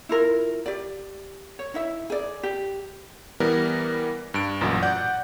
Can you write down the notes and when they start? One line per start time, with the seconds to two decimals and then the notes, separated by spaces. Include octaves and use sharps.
0.09 E4 F4 A#4
0.66 G4 D5
1.59 C#5
1.74 D#4 E4 E5
2.10 G#4 D5
2.43 G4
3.40 E3 G3 B3 A#4
4.34 G2 D7
4.61 A1 F#2 A#2 F#4
4.82 D5 F#5 G6